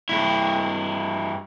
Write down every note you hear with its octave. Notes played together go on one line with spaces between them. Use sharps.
G2 E4